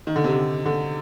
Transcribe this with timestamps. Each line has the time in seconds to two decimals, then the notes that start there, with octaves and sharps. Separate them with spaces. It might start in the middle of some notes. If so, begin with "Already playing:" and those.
0.07 D#3
0.16 D3
0.24 C3
0.32 D3
0.65 D3